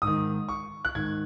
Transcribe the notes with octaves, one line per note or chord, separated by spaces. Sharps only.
G#2 D#3 D#6
C#6
F#6
G#2 D#3 G#6